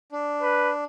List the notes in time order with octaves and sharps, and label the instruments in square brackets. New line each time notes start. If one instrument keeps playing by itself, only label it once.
[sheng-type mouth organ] D4
[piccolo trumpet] B4